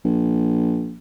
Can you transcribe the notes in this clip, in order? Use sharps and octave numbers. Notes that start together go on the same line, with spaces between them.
A#1